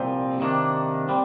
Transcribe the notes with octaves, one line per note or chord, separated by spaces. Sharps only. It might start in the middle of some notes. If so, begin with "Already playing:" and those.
Already playing: C2 A#2 F3 C4
C3 D#3 A#3 D4
G3 C4